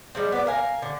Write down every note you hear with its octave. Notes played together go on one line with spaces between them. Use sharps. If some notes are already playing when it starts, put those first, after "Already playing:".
G3 G#3 C4
B3 D5
A#4 F5 G#5
D3